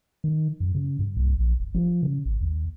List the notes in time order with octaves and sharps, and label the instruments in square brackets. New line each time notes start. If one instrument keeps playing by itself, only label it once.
[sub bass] D#3
F#2
C#3
G2
C2
A#1
F#1
F3
C#3
G#1
D#2